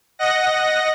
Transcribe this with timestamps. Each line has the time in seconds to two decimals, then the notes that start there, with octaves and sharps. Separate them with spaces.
0.19 D#5 F#5 A#6